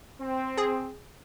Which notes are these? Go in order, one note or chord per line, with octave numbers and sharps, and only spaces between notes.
C4
G#4